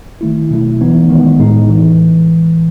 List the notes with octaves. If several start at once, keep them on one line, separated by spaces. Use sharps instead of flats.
D#3 A3 E4
B2 F#3 A3 E4
E3 B3 D#4
D#3 G#3 B3
A2 G#3 D#4
E3